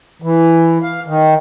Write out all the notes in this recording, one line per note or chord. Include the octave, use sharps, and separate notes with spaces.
E3
F5
D#3